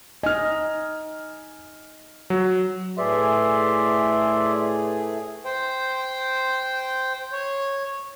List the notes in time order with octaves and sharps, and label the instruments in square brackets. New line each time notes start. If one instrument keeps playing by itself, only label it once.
[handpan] D#4 D#5 [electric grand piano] G#5 F6
[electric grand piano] F#3
[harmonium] A2 A3 G#4 [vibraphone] B4 G#5 [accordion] D5 E5 C6
[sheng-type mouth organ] C5 G5
C#5